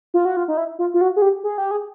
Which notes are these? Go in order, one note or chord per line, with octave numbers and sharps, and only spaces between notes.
F4
F#4
F4
D#4
E4
F4
F4
F#4
G#4
G4
G#4
G4
G#4